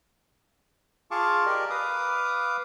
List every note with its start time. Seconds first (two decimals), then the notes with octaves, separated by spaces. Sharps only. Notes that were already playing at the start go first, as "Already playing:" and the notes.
1.11 F4 G#4 F5 A5 C#6 D6
1.46 G4 A#4 D5 D#5
1.70 B4 F5 D6 D#6